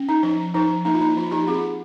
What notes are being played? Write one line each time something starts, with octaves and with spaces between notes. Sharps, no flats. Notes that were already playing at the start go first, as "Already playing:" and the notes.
Already playing: C#4
D#4
F3 D#4
F3 D#4
A#3 D#4
F4
D#4
F3 F4
D#4 G4
C4 F4 G#4